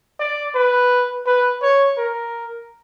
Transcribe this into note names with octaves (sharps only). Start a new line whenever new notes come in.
D5
B4
B4
C#5
A#4